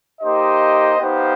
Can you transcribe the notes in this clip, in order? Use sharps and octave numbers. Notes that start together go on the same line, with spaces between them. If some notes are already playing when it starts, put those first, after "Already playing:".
A#3 D#4 G4 C5 D#5
B3 D#4 G4 C5 F5